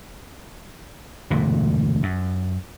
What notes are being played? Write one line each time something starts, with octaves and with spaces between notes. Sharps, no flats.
E1 D2 G2 A#2
F#2